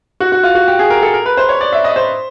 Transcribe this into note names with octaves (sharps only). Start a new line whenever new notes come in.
F#4
F#4
F4
F#4
G4
G#4
A#4
A4
A#4
B4
C5
C#5
D5
E5
D#5
C5